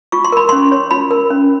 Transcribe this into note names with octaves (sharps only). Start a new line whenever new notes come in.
F4 C#6
C6
A#4 B5
C#4 C6
C#5
F4 B5
A#4
C#4